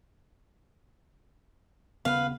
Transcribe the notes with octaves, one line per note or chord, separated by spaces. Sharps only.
D#1 C#3 B3 B4 F5